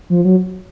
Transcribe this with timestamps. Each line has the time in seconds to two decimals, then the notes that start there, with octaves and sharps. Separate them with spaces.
0.10 F3
0.25 F#3